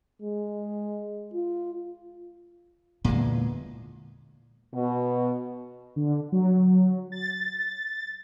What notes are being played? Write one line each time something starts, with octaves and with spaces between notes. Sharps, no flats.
G#3
F4
E2 A#2 D3 G#3
B2
D3
F#3
A6